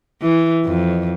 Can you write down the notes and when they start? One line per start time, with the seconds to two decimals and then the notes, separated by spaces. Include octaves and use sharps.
0.22 E3
0.65 F2